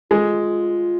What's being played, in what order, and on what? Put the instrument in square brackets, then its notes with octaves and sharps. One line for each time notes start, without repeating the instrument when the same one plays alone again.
[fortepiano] G#3 [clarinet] F4